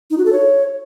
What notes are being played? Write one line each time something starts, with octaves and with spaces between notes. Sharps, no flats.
D#4
F#4
A4
C#5